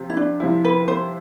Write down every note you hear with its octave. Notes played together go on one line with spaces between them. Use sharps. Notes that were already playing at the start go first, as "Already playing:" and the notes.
Already playing: C3 F3 C4
E4
D4
C3 F3 C4 E4
B4
C5